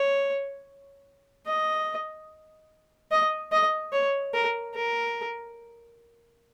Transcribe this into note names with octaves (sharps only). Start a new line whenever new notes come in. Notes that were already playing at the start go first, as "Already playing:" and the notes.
Already playing: C#5
D#5
D#5
D#5
C#5
A#4
A#4